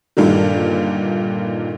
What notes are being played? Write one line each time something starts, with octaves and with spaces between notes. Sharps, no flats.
G2 A#2 D3 D#3